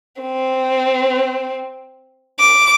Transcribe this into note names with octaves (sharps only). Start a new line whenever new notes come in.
C4
D6